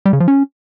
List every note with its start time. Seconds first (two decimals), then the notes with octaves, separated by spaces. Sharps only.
0.06 G3
0.13 C#3
0.20 F3
0.28 C#4